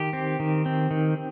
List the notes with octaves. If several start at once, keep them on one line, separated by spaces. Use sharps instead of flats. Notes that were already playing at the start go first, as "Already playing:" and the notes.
Already playing: D#3 G4
C4
D#3
C4
D#3